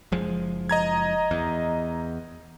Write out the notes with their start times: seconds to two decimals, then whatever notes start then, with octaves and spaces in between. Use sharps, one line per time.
0.12 F#1 F3 G#3
0.69 D#5 A#5 G#6
1.31 E2